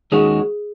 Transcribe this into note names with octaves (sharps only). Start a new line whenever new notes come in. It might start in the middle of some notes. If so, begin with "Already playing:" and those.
D#2 D#3 G#3 C#4 F#4 G#4